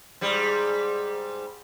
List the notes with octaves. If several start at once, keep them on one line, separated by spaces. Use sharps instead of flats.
G#2 G3